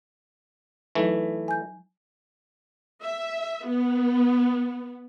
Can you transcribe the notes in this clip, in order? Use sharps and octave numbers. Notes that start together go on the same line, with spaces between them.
E3 F#3 A3 D#4
G#5 G6
E5
B3